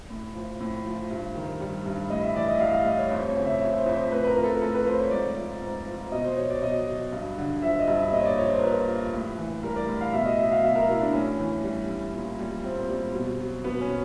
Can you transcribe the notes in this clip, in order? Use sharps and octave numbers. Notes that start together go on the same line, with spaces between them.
A2
F3
A2
F3
G2
D#3
G3
G2
A2 D#5
E5
E3 D5
D#5
E5
G3 F5
F5
A2 D#5
C#5
F2 C5
C#5
C#3
E5
F3 C#5
C5
F2
C5
A2 B4
B4
A#4
F3
A4
A2 A4
B4
F3 C5
C#5
G#2 D5
F3
G#2
F3
B2 D#5
C5
F#3 C#5
D5
B2 D#5
F#3
G2
D3
F3 E5
D#5
G2
E5
A#2 D#5
C#5
D5
F3 C#5
C5
A#4
A#2 B4
F3
A2
E3
G3 A#4
D5
A2
F5
B2 E5
D#5
F#3 E5
F5
B2 E5
A#4
F#3 E4
D4
A2 C#4
E3
G3
A2
A#2
G3
A#2 C4
G3
B2
F#3
B2 B3
C#4
F#3